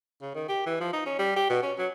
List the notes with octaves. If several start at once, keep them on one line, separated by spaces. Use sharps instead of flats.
C#3
D#3
G4
E3
F3
D#4
C#4
G3
G4
B2
C#4
F#3